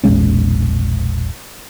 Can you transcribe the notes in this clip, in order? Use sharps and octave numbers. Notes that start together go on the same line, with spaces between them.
E1 A#1 G#3 C#4